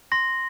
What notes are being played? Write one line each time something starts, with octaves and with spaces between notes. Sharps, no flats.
C6 A#6